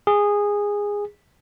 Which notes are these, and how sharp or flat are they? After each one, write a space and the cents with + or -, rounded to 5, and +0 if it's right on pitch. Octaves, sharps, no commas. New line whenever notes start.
G#4 -15